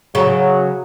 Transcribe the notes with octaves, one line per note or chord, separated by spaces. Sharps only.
C#3 F#3